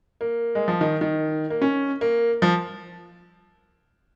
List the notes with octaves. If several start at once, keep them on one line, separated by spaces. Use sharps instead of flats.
A#3
G#3
F3
D#3
D#3
A#3
C#4
A#3
F3